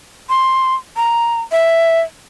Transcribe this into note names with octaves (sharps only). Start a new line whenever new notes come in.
C6
A#5
E5